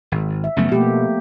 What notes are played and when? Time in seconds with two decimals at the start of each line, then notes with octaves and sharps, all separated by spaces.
0.12 G#1
0.44 E5
0.57 F#2 C#3 F3 A3 B3
0.72 B2 A3 A#3 G4